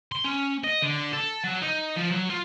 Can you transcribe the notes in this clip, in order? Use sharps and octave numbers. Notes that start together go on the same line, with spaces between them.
C6
C#4
D#5
D3
A4
F#3
D#4
F3
F#3
F4